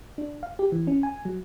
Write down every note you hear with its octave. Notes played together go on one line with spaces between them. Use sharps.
D4
F5
G4
E3
C#4
G#5
F#3